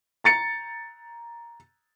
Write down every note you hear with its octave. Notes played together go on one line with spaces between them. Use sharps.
A#5 A6 C#7